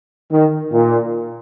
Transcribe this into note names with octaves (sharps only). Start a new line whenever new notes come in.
D#3
A#2